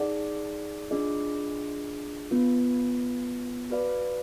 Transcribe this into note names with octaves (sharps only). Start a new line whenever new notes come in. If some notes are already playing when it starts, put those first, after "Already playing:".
Already playing: D#4 G#4 D5 F#5
D4 F4 G#4 D#5
B3 F4 B4
F#4 B4 D5 F5